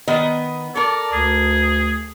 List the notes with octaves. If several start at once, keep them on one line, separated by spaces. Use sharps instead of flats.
D#3 B3 D#5
A4 A#4 D5
D2 G#4